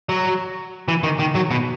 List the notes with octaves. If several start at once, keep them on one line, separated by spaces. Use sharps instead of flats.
F#3
E3
D#3
D#3
F#3
B2